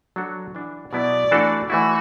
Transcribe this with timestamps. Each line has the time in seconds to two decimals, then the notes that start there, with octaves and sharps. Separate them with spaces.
0.16 F#3 D4 F#4 A4
0.55 E3 D4 F#4
0.93 B2 F#3 B3 E4 D5
1.31 E3 A3 D4 F#4 A4
1.70 E3 A3 E4 F#4